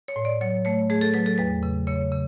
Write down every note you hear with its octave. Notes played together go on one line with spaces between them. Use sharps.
C#5
A2
D5
F#3 C#5
A3 C#5
A3 G#4
A4
F#3 B4
A4
E2 B4
C#3
C#3 C#5
C#3